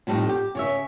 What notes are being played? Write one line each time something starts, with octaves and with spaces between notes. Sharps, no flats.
F2 A2 G3 A3 D#4
G4
C#3 C#5 E5